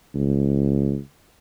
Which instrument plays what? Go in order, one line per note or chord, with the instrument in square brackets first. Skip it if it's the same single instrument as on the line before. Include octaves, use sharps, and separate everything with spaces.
[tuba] C#2